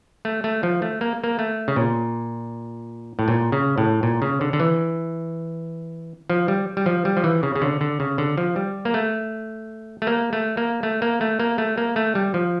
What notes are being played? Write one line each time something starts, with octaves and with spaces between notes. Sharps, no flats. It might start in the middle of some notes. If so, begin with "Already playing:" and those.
A3
A3
F3
A3
A#3
A#3
A3
C#3
A#2
A2
A#2
C#3
A2
A#2
C#3
D3
D3
E3
F3
G3
G3
F3
G3
F3
E3
C#3
C#3
D3
D3
C#3
D3
F3
G3
A#3
A3
A3
A#3
A3
A#3
A3
A#3
A3
A#3
A3
A#3
A3
G3
F3